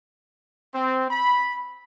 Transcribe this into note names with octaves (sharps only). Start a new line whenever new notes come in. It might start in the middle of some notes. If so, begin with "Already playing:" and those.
C4
B5